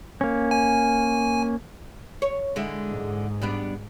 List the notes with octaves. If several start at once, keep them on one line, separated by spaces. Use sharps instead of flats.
A#3 C#4
G#5
C#5
D3 G#3 E4
G#2
G3 B3 D4